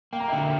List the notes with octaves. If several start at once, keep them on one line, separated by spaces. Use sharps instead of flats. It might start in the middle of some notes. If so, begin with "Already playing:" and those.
A#3 G5
A#5
D3 E5 G5